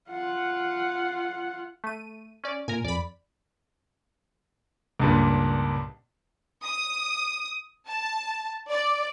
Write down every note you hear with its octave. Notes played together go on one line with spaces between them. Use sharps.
F4 F#5
A3 D#7
C#4 D5
A#2 A#4 G#5
F2 D5 B5
C#2 G2 A#2
D#6
A5
D5